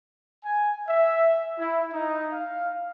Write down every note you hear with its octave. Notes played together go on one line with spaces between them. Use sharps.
G#5
E5
E4
D#4
F5